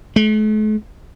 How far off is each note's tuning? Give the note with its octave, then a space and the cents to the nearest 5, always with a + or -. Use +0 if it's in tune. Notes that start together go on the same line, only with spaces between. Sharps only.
A3 -45